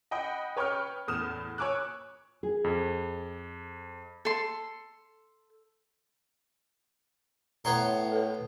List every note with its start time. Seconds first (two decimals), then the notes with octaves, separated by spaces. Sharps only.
0.11 D#5 F#5 G5 B5 D#6
0.56 B4 C#5 G5 C#6 D#6 F6
1.08 E2 A2 D#6 F6 E7
1.58 C#5 G#5 D6 E6 F#6
2.43 G#4
2.64 F2
4.25 A4 C6
7.65 A2 B3 C#5 A#5 C6
8.12 A4 B4